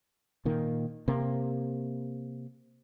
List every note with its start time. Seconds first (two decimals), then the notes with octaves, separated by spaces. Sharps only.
0.45 A#2 D#3 A#3
1.08 C3 A#3